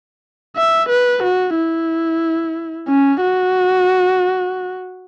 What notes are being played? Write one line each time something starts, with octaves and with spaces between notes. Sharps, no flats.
E5
B4
F#4
E4
C#4
F#4